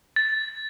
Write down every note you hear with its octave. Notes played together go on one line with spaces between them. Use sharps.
A6